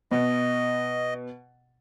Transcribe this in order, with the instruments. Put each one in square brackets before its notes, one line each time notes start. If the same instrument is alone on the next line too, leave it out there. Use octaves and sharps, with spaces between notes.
[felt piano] B2 [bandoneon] D#5